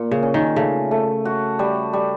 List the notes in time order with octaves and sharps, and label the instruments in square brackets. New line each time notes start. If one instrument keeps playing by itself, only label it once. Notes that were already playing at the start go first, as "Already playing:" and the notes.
Already playing: [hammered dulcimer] A#2
[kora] C#3
[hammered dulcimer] C#4
[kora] D#3
[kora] C#3 [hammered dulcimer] A3
[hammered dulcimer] A3
F#4
G3
G3